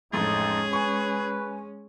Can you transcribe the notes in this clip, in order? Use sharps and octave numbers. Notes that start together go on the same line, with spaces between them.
A1 F2 G#3 C#4 D#4 G#4
B4 G#5 C#6